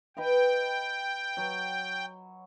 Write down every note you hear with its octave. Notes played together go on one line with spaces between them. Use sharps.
B4 D#5 F5 G5
F#3